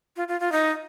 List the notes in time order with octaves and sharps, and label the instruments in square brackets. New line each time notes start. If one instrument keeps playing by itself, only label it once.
[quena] F4
F4
F4
D#4